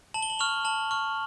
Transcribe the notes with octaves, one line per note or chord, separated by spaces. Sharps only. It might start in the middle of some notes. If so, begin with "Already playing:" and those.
A5 F#7
G7
F#7
C#6 F6 F7
A5 F#7
C#6 F6